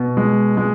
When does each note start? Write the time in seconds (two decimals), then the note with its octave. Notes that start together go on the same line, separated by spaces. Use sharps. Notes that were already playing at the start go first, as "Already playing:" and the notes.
Already playing: B2
0.17 G#3
0.57 G#3